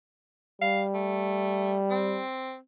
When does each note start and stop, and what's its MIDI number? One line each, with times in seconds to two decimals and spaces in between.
0.61 2.22 55
0.61 0.83 77
0.94 1.77 57
1.90 2.58 60